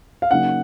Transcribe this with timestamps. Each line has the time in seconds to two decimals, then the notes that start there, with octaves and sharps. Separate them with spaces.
0.22 F5
0.31 C#3 F#3 A#3 D#4 F#5